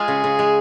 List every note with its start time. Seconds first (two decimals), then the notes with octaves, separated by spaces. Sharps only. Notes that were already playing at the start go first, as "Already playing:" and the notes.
Already playing: G#3 F4 G#4
0.08 C#3
0.24 C#3
0.39 G#3